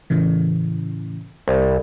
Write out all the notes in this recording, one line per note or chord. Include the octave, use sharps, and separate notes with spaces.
A2 C#3 E3
C2